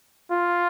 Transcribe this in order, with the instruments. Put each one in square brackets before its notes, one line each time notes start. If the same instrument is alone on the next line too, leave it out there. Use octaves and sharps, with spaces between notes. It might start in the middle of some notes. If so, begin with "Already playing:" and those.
[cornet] F4